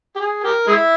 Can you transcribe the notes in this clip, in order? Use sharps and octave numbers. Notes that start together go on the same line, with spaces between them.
G4
G#4
G4 A#4
G#3 E4